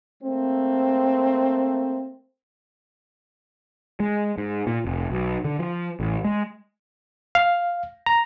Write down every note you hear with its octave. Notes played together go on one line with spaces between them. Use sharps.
A3 A#3 C4
G#3
G#2
A#2
F1
B1
D3
F3
A1
G#3
F5
A#5